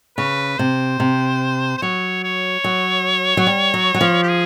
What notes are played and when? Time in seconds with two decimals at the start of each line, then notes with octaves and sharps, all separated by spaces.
0.17 C#3 B4
0.59 C3 C5
1.00 C3
1.77 C5
1.82 F#3 C#5
2.24 C#5
2.64 F#3
3.37 F#3
3.47 G3
3.74 F#3
3.94 F#3
4.01 F3
4.23 G4
4.29 G#4